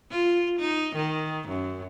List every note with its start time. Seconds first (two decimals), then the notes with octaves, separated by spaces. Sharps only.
0.10 F4
0.59 D#4
0.95 D#3
1.48 F#2